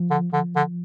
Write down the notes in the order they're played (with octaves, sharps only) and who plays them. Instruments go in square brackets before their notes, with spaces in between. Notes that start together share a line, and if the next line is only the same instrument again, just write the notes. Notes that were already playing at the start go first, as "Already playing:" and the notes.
Already playing: [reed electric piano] F3
[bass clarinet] D3
[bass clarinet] D3 [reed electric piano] F3
[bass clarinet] D3